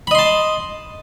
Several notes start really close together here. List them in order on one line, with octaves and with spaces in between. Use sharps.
B5 D#5 C6 A5